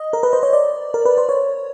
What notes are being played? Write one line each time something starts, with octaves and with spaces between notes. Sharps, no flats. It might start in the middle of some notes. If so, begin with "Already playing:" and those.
Already playing: D#5
A#4
B4
C5
C#5
D5
A#4
B4
C5
C#5